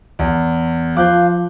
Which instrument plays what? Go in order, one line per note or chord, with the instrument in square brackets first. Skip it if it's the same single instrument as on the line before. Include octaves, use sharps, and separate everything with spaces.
[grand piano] E2
[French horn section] F3 [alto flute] F5 [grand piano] D6 F#6 G6